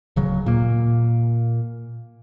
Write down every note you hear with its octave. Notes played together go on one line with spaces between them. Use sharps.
D1 C#3 F#3
A#2 A#3